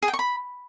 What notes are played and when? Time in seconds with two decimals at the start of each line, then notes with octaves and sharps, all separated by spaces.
0.02 G#4
0.08 G5
0.13 C#6
0.19 B5